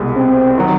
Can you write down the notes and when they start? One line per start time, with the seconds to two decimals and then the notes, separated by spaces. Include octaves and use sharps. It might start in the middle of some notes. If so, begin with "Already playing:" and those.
Already playing: C2 B2 G#3
0.16 C4
0.58 D#3 F#3